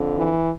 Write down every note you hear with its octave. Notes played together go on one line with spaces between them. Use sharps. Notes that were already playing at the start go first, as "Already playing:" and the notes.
Already playing: F2 D3
E3